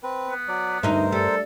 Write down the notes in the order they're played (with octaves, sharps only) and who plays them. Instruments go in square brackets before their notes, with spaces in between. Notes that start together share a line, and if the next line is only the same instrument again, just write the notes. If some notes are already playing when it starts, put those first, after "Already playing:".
[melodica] C4 B4
[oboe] B3
[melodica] F#3 D5
[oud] D2 D#4 E5 [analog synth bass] G2 [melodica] A#4 C5
[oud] G3 [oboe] A4